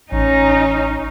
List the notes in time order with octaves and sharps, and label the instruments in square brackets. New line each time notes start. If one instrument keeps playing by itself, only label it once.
[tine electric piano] A1 [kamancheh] C#4 [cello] D#4